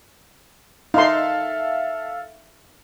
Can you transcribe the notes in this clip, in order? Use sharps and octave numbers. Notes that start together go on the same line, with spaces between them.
D#4 A4 E5 F5 C6